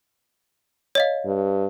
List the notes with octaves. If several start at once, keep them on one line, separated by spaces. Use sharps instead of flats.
C#5 D#5 F5
G2